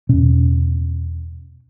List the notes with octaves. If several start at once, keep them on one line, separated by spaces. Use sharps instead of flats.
E2 B2 C#4